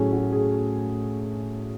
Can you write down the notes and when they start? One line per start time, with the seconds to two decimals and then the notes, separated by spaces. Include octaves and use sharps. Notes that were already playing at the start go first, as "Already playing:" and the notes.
Already playing: A2 F#3 A3 C#4 G#4
0.12 F#4
0.33 G#4